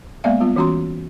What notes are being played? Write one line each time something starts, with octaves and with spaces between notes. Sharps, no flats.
G#3 A#3 B3 D5 E5 F5
G3 B3 F4
E3 C#4 F#4 A#5 C6